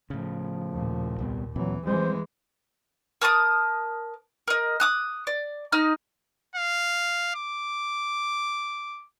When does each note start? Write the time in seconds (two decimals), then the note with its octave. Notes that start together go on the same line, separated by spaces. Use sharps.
0.10 A2 C#3 F3
0.71 D#2 A#2
1.19 C2 G3 B3
1.56 D2 A#2 E3 F#3 C4
1.86 E3 F3 G3 G#3 C4 C5
3.21 A#4 A5 D6 D#6
4.48 A#4 D#5
4.80 D6 D#6 F#6
5.27 D5
5.72 D#4 D#5 F6
6.56 F5
7.36 D6